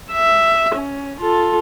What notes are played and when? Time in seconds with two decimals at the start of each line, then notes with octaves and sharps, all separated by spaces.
0.11 E5
0.75 C#4
1.21 F4 A4